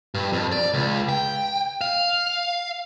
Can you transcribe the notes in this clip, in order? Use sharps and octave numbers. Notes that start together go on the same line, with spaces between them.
G2
F2
D5
C#2
G5
F5